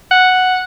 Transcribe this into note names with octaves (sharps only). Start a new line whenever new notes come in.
F#5